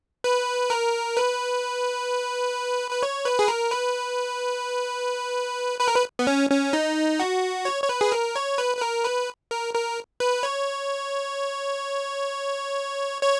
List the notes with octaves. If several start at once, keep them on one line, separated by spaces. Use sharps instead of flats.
B4
A#4
B4
B4
C#5
B4
G#4
A#4
B4
B4
A#4
B4
B3
C#4
C#4
D#4
F#4
C#5
C#5
B4
G#4
A#4
C#5
B4
B4
A#4
B4
A#4
A#4
B4
C#5
C#5